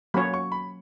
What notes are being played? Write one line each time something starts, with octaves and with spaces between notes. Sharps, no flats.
F#3 A#3 C#4 F#4 C#5 B5
C#6
B5